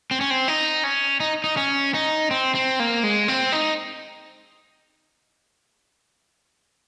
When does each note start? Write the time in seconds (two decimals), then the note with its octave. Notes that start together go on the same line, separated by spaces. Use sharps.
0.11 C4
0.21 C#4
0.30 C4
0.48 D#4
0.84 C#4
1.20 D#4
1.44 D#4
1.57 C#4
1.94 D#4
2.31 C4
2.55 C4
2.80 A#3
3.03 G#3
3.28 C4
3.52 D#4